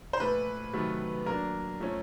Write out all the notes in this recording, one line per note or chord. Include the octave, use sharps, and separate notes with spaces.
C5
A#2 F3 A3 B4
C3 D#3 F#3 A3
F#3 A#3 D4 A#4
F3 A3 C#4